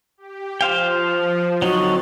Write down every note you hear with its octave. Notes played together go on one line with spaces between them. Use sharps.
G4
F3 C5 F5 G5
D3 F#3 C4 D#4 F#4 A6